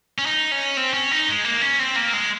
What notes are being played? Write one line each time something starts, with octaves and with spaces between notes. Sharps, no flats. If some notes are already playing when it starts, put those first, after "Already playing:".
C#4
D#4
C#4
C4
C#4
D#4
G#3
A#3
C#4
C4
A#3
G#3